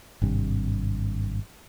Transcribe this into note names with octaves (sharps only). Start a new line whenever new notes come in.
G#1 G2 C3